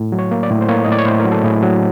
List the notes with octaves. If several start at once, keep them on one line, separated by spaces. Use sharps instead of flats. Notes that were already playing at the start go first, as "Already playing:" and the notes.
Already playing: A2
F#3
C#5
A#3
D5
A2
C5
A#3 C#5
D#5
A2 D5
C#5
A2 C5
A#4
F#3
A4
A2 G#4
F#3